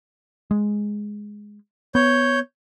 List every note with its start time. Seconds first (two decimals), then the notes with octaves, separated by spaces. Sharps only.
0.51 G#3
1.95 B3 C#5 G6